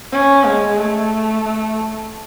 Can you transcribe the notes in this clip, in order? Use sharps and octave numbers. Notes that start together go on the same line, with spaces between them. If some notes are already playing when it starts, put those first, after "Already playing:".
C#4
G#3
A3
A3